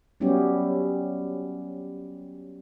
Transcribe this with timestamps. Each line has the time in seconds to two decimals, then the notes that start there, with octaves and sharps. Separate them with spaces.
0.20 F#3 G3 B3 C#4 E4 G4